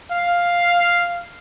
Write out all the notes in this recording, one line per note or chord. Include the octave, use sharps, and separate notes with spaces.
F5